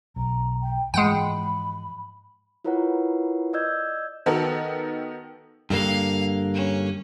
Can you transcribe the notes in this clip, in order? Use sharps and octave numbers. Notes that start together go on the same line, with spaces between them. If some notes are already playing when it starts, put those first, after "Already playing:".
B1 A#5
G5
G#2 E3 F3 G#3 F#5 G5 B5
E4 F4 A#4 B4 C#5 F#5
D5 D#5 E6 G6 G#6
D#3 B3 F#4 A4 A#4
G2 D3 A#3 F5
C#4